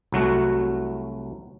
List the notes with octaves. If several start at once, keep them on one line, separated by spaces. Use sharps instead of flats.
C2 F#3 A3 F#4